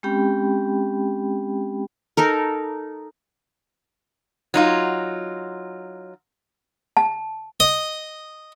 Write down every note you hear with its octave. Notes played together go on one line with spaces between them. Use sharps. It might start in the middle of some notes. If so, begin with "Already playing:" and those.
G#3 C4 C#4 G4 G5 B5
D#4 A4 A#4
F#3 D#4 F4
A5
D#5